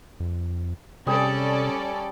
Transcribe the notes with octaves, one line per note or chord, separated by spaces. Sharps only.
F2
C3 G3 C#4 G#4 A4 D5